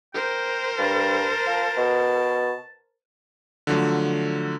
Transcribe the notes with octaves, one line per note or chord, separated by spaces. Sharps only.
A#4 C5 G5
G2 A5
F3
B2
D3 F3 F#3 A3